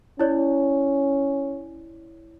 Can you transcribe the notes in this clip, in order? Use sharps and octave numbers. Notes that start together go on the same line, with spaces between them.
C#4 E4 C#5 D5